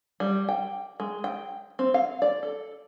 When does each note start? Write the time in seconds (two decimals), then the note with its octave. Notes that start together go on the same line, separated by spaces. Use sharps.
0.20 G3
0.49 G5
1.00 G#3
1.24 G5
1.79 C4
1.94 F5
2.22 D5
2.43 A4